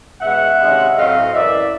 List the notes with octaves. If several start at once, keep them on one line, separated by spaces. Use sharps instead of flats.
B2 G#3 C#4 E5 F#5
C3 D#3 G#3 C#4
A2 F#3 A3 C4 D#5 F5
F#2 C#3 E3 D5 E5